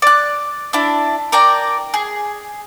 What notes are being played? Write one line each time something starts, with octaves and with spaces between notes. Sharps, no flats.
D5 F#6
D4 E4
A#4 D5 G5 A#5
G#4